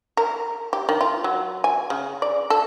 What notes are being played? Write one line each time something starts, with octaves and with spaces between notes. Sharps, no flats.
A#4
G4
D#3
F4
F#3
G#5
C#3
D5
A4